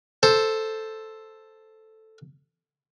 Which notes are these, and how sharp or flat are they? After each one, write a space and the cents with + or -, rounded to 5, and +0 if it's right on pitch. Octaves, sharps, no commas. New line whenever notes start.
A4 +0 C5 +0